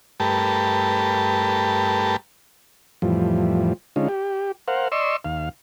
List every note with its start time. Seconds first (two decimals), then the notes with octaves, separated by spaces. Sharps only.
0.20 G2 A3 G4 A#4 B4 A5
3.02 F2 A2 E3 F3 G3
3.96 D3 G#3 C#4 D#4 F4
4.09 G4
4.68 A#4 C5 F5 F#5
4.92 D5 D#5 C6 C#6 E6
5.25 D#2 F5